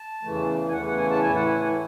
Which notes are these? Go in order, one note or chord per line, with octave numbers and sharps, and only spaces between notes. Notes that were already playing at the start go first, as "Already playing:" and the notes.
Already playing: A5
E2 C#3 E3 A3
G#5
E2 C#3 E3 A3 F#5
F#5
G#5
A5
A2 E3 A3 E4 G#5
F#5
G#5
G#5